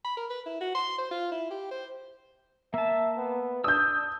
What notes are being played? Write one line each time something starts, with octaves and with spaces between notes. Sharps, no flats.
B5
A#4
B4
E4
F#4
C6
C5
F4
E4
G4
C5
A#3 E5 A5
B3
D4 D#6 E6 G6